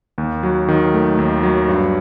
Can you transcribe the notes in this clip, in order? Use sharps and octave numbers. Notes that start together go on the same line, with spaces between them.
D#2
F#3
D#3
A3
D#2
F#3
G2